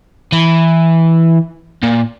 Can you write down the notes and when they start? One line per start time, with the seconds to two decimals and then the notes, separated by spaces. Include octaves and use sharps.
0.32 E3
1.83 A#2